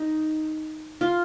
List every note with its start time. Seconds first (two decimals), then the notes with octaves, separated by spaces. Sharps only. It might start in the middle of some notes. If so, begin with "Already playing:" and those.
Already playing: D#4
1.01 F4